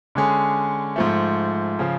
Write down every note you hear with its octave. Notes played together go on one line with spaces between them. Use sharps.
D3 G#3 C#4 G#4
G#2 F3 A3
C#3 F3